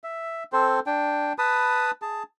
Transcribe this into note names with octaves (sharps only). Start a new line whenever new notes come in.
E5
C4 A4 C5
D4 G5
B4 A5 B5 D#6
G#4 A5